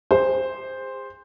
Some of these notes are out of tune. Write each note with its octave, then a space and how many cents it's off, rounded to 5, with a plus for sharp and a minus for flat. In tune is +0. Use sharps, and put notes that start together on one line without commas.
G#4 -40 C5 +0